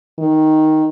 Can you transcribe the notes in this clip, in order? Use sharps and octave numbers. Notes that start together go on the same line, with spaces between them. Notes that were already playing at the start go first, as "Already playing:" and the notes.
D#3